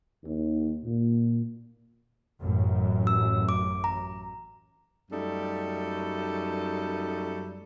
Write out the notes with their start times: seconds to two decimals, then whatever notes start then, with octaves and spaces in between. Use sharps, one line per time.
0.23 D#2
0.83 A#2
2.42 A1 F#2
3.07 E6
3.49 D6
3.84 A#5
5.11 F#2 G3 A3 D#4 A4